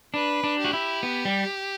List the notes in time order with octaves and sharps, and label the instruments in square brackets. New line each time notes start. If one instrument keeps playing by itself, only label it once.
[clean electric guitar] D4 [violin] B4
[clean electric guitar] D4
[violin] G4
[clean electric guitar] F#4
E4
B3
G3